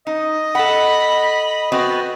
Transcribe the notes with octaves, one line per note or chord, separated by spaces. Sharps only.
D#4 D#5
A4 F#5 B5
B3 C4 F#4 D#5